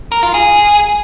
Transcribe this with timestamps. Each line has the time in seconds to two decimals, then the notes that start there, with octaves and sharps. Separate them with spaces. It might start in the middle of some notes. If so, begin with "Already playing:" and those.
0.12 A#4
0.23 F4
0.34 G#4